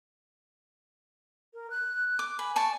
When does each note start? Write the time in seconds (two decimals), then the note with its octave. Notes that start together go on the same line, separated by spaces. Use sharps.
1.54 A#4
1.70 F#6
2.19 D6
2.39 B4 G#5
2.56 D5 A5 C#6